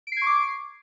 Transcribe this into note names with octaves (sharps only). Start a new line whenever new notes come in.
C#6 D6 G#6 C7 D7